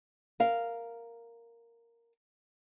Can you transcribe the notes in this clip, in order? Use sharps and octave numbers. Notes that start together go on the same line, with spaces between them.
A#4 F5